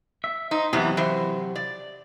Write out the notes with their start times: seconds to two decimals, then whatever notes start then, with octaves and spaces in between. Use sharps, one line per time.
0.24 E5
0.51 D#4 C5
0.73 E2 C3 E3 F#3 B3
0.97 E3 C5
1.56 D5